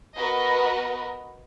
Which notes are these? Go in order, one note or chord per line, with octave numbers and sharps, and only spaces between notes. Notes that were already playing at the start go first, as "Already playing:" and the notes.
B3 F#4 A#4 B4 D#5